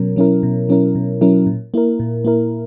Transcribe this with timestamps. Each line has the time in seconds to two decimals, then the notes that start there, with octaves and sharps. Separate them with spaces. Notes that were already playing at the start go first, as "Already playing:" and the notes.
Already playing: B2 F#3 C#4 A#4
0.16 F#3 C#4 E4 A#4
0.43 B2
0.69 F#3 C#4 E4 A#4
0.95 B2
1.21 F#3 C#4 E4 A#4
1.46 A#2
1.74 A#3 E4 A#4
2.00 A#2
2.25 A#3 E4 A#4